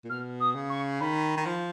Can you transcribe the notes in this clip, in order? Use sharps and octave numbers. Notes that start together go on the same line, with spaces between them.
A#2
B2 F6
D#6
C#3
C#6
D#3 B5
D#3
F3